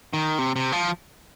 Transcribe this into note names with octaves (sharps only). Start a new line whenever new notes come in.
D#3
C3
C3
F3